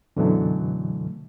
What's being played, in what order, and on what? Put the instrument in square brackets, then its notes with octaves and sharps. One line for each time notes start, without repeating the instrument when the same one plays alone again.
[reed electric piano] F#2 B2 D3 E3 F#3 A3